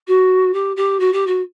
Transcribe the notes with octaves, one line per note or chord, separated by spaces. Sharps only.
F#4
G4
G4
F#4
G4
F#4